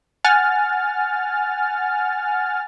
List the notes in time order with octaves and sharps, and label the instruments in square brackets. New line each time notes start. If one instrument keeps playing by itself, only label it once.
[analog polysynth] F#5 G#5 F6 A6